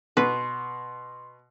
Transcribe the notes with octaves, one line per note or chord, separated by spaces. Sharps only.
B2 B4 C6